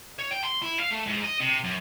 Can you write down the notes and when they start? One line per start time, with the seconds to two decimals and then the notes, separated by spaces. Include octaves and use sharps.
0.19 C#5
0.31 G5
0.44 C6
0.62 E4
0.80 F5
0.91 A3
1.06 G#2
1.24 D#5
1.40 C3
1.64 F#2